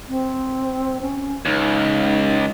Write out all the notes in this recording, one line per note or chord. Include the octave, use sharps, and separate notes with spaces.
C4
C#4
C#2 D#4